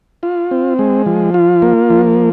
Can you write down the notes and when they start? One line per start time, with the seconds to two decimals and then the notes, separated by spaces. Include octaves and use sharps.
0.23 F4
0.51 C4
0.79 G#3
1.06 F3
1.34 F4
1.62 A#3
1.90 F3